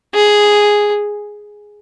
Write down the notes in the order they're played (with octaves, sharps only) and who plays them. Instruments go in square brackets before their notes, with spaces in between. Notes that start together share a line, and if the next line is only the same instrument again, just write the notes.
[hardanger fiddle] G#4